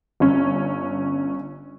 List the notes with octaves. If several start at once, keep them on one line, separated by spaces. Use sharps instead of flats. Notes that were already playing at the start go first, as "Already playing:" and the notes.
G1 C#4